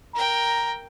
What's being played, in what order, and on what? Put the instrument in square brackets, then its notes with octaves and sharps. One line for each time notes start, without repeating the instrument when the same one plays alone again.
[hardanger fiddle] A#4 G5 [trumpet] A#5